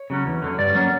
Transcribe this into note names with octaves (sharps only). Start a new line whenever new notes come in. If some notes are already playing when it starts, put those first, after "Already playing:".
Already playing: C#5
C#3 F#3 C#4
E2
D3 F#3 C#4
G2 D5
F#3 A#3 C#4